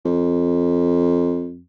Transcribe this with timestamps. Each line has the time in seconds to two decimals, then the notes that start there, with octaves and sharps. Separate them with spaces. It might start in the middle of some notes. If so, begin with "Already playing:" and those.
0.05 F2